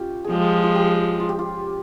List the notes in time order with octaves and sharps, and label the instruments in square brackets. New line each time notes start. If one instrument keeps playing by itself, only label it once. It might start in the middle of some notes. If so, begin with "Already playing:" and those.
Already playing: [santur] C#4 F4 G4
G#4
[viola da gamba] F3 G#3 [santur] G4
[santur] F4
G4
F4
G4
F4